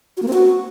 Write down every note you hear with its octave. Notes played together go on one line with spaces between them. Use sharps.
F#4
A#3
C4
F#4